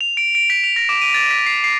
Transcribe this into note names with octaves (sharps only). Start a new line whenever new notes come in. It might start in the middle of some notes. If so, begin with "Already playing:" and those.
F7
D7
D7
B6
F7
A#6
D6
D#7
A6
B6
C7
C7